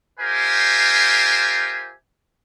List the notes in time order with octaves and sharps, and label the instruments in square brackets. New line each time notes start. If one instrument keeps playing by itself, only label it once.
[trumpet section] F4 G4 A#4 C5 E5 G#5